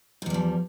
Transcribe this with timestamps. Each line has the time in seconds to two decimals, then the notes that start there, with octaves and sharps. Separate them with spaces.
0.22 G#2
0.26 E2
0.30 G3
0.34 F3